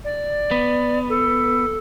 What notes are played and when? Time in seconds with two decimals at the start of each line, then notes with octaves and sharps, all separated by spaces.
0.04 D5
0.51 B3
1.09 A4